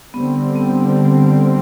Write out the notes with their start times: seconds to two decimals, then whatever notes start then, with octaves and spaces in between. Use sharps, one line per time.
0.14 D3 G3 B3 C4
0.56 B3